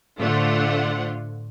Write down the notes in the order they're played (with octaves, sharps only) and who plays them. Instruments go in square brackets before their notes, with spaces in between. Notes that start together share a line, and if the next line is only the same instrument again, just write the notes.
[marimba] A2 [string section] D3 F4 [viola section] A3 C5 F#5